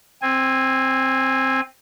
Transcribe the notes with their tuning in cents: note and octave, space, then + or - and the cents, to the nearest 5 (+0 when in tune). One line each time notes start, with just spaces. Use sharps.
C4 +10 G#5 -20